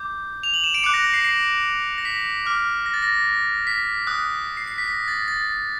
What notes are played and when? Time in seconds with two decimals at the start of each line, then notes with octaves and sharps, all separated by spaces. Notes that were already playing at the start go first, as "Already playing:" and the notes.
Already playing: D6 G6
0.43 F7
0.54 F#7
0.64 E7
0.74 D7
0.83 D6 F#6 C#7
0.94 A#6
1.04 A#6
1.14 C7
1.24 C7
1.98 A#6
2.05 B6
2.46 D6 F6
2.86 A#6
2.94 A6
3.02 A#6
3.67 B6
4.07 D#6 F#6
4.57 C7
4.67 C7
4.78 B6
4.88 A#6
5.08 A6
5.28 A6